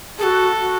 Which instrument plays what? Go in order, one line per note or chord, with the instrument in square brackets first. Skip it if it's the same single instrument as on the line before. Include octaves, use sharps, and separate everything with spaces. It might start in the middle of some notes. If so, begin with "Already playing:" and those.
[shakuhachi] G#4 [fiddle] A4
[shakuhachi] F#4
F#4